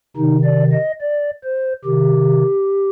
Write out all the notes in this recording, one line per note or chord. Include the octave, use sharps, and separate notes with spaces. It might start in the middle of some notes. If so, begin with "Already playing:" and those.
C3 D#3 D#4
D5
D#5
D5
C5
C3 D#3 G4